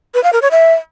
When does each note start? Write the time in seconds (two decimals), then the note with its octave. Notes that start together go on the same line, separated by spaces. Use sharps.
0.14 B4
0.23 F5
0.33 A#4
0.42 C#5
0.51 E5